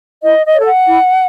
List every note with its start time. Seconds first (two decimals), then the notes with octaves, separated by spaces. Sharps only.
0.22 E4 D#5
0.45 D#5
0.54 A4 C#5
0.66 F#5
0.86 E4